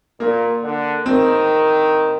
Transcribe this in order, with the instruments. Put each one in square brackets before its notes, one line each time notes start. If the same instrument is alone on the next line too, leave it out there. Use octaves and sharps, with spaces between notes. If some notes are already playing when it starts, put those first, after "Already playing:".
[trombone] A#2 [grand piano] A#3
[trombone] D3
[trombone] D#3 [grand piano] C4